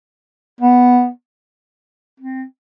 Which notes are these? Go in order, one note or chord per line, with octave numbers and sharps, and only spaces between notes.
B3
C4